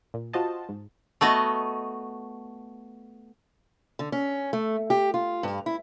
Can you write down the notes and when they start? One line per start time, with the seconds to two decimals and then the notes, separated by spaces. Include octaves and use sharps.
0.14 A#2
0.33 F4 F#4 C5 D#5 A5
0.69 G#2
1.21 A3 B3 F#4 D#5
3.99 D3
4.12 C#4
4.53 A3
4.90 G4
5.14 F4
5.43 G2
5.66 E4